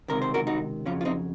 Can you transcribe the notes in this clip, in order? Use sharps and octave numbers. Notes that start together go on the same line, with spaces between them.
C#2 C3 D#3 A#4
C5
F#4 A#4
D#4 F#4
F2 C#3 F#3 C#4 F4
F4
C4 D#4